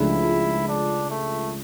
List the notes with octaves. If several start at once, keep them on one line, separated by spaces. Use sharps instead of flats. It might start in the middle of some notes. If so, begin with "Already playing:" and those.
Already playing: C#2 C#3 F3 A3 D4 E4
D4
A3